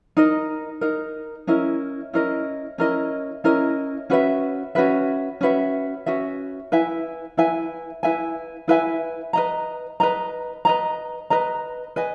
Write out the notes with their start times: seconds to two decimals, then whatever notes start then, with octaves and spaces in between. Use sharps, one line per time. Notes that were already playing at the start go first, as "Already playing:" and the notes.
0.17 D#4 A#4 D#5
0.81 D#4 A#4 D#5
1.47 C#4 E4 A#4 D#5
2.13 C#4 E4 A#4 D#5
2.78 C#4 E4 A#4 D#5
3.44 C#4 E4 A#4 D#5
4.10 C#4 F#4 B4 E5
4.75 C#4 F#4 B4 E5
5.41 C#4 F#4 B4 E5
6.06 C#4 F#4 B4 E5
6.72 E4 B4 E5 G#5
7.37 E4 B4 E5 G#5
8.03 E4 B4 E5 G#5
8.68 E4 B4 E5 G#5
9.33 B4 D#5 A#5
10.00 B4 D#5 A#5
10.65 B4 D#5 A#5
11.30 B4 D#5 A#5
11.96 B4 D#5 G#5